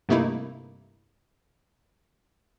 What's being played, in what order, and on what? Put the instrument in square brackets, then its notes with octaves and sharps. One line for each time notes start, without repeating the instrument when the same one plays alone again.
[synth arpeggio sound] G2 C3 A3 A#3 D#4 E4